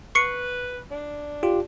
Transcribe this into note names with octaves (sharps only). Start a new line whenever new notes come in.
B4 C#6 C7 C#7
D4
F4 G4